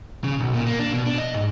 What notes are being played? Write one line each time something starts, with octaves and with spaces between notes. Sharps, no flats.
C#3
B1
A#2
A#3
D4
B2
D4
D#5
G#2